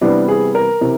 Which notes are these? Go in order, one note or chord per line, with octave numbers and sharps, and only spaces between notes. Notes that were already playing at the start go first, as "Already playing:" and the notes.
C3 E3 G3 B3 D4
G#4
A#4
C3 E3